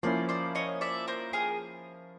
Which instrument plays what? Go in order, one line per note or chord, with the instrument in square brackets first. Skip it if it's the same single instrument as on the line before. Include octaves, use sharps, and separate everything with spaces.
[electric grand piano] F3 A#3 C#4 E4 [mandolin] C5 D5
[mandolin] C5 D5
C#5 D#5
D5 E5
A#4 C5
G#4 A#4